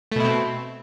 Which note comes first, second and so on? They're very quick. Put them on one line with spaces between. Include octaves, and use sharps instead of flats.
A3 B2 E4 C4